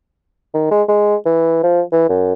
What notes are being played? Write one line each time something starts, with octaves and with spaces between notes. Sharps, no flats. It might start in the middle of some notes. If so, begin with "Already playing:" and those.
D#3
G#3
G#3
E3
F3
E3
F#2